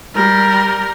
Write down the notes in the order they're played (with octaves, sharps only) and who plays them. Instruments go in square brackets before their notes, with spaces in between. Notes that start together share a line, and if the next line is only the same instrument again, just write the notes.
[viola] G3 A#4